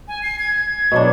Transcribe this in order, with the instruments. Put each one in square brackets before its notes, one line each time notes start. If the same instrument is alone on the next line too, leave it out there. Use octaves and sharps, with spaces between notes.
[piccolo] G#5
C7
G#6
G#6
[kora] B2 F#3 D4